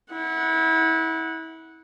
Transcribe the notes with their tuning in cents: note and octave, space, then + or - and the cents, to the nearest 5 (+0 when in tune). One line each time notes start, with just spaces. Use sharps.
E4 -30 F#5 -10